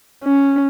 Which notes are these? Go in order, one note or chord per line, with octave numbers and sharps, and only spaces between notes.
C#4